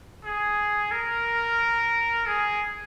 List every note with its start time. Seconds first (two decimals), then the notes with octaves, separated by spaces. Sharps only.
0.24 G#4
0.91 A#4
2.27 G#4